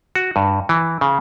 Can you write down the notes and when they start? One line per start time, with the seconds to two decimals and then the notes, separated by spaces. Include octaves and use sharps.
0.15 F#4
0.36 G2
0.69 E3
1.01 C#3